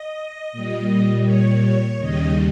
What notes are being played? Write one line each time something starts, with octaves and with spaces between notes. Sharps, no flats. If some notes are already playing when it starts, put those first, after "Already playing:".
Already playing: D#5
A#2 G3
C#5
C#5
D#2 C#3 G3 D#5